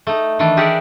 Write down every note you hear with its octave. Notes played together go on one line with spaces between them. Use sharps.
A3 D#4
D#3 E3 A3 D4
G4 G#4 A#4 D5 E5 F#5